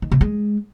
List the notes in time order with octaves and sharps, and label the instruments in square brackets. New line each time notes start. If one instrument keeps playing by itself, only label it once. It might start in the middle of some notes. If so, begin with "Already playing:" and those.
[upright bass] D#3
C3
G#3